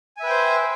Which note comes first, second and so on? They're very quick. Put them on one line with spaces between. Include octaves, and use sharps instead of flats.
G#5 E5 B4 G5 C5